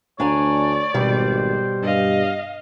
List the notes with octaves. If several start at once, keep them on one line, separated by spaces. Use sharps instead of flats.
D2 D4 C#5 D5 G#5 A#5
G#1 B2 G3 C5
G2 D#5 F5